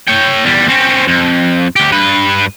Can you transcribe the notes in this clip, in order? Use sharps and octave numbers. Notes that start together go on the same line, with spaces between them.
C#5 G5
E2 G3
C4 C#4
F2
D2 G4
G2 B4